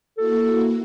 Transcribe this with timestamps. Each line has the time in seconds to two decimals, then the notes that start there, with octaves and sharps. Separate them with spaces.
0.18 A#3 E4 F#4 A4